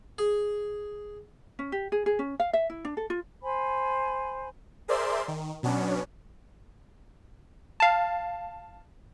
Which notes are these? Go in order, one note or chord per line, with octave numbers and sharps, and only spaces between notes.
G#4
C#4
G4
G#4
G#4
C#4
F5
E5
E4
D4
A4
F4
C5 G#5 B5
G#4 A#4 C5 D5 E5 C6
D#3
B2 F#3 B3 C#4 D4
F5 A5